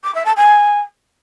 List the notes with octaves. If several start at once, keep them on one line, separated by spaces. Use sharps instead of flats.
D6
E5
A5
G#5